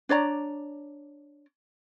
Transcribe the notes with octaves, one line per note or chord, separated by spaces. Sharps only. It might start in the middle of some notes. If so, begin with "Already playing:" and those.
D4 C#5 D5 A#5